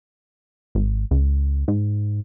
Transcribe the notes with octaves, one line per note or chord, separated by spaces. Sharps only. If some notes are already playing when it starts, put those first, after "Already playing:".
G#1
C#2
G#2